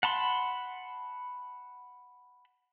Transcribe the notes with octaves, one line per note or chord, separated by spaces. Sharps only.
F#5 A5 B5 C6